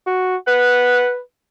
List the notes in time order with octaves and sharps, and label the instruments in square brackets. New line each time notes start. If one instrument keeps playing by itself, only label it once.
[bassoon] F#4
[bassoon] B4 [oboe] F#5